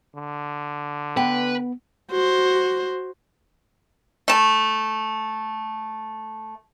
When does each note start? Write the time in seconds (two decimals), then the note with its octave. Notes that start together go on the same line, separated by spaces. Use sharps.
0.15 D3
1.17 B3 B4 G5
2.11 F#4 C5
4.28 A3 A5